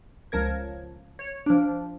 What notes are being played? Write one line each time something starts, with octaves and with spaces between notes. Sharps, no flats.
C#2 F3 A#4 G#6
C#5
F3 D4